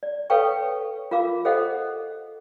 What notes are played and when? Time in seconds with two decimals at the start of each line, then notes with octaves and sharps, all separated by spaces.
0.03 D5
0.30 A4 B4 C#5 F5 G5 C#6
1.11 F4 A#4 F5 D6
1.45 G#4 A4 C5 D#5 F5 F#5